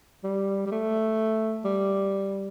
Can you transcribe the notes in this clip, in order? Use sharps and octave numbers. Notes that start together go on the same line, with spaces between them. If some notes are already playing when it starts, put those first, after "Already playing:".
G3
G3
A3
G3